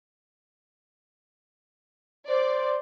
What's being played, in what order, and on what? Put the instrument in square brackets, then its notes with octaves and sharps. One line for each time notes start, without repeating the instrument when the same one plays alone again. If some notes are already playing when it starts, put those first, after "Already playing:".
[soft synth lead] C5 [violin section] D5